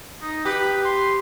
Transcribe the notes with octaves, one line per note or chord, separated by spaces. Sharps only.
D#4
G4 B4
C6